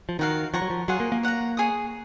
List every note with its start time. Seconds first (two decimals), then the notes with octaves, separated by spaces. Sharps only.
0.09 F3
0.19 D#3 D#4 F#4 A#4 F5
0.54 F3 C#5 F#5 A#5 C#6
0.62 F#3
0.70 F3
0.88 F#3 F4 G#4 C#5 F#5
1.00 A#3
1.12 A#3
1.23 C#5 F#5 A#5
1.57 G#4 C#5 G#5 D#6